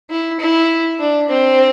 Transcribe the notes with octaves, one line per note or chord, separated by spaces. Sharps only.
E4
E4
D4
C4